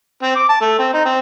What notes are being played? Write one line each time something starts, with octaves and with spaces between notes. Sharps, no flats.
C4
D6
A5
A3
C4
D#4
C4